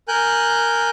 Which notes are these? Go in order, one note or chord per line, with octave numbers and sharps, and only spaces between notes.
A#4 G#5 F#6 G6